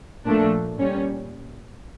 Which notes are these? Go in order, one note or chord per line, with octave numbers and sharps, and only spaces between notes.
A#2 F3 A3 D4
A#2 G3 C#4